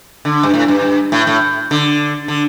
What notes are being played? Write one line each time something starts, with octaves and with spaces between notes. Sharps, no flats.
D3
G2
A2
G2
A2
A2
D3
D3